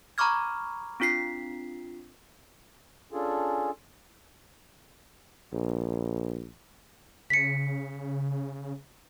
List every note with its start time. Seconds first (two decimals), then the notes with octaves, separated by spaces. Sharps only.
0.18 A#5 B5 C#6 D6 F6 G#6
1.00 C4 D4 F4 B6 C7
3.12 C#4 D4 F4 G#4 A4
5.53 A#1
7.30 C#3 B6 C#7